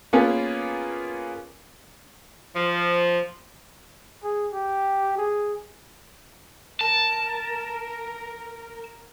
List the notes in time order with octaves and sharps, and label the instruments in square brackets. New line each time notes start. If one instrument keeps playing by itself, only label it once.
[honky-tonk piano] A#3 B3 C#4 F4 G#4
[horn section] F3
[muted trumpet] G#4
G4
G#4
[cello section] A#4 [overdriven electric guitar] A5